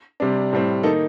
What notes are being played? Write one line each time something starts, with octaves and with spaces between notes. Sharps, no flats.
C3 G3 D4
A2 G3 C4
D#3 A#3 D#4 A4